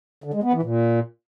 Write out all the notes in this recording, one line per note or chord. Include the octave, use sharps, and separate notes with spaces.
D3
G#3
B3
E3
A#2